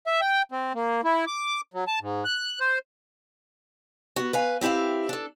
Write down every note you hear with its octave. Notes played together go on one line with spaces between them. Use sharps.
E5
G5
C4
A#3
E4
D6
F#3
A5
G#2
F#6
C5
B3 F#4
B4 F5 G#5
C4 E4 G4 E5 F5
D4 A4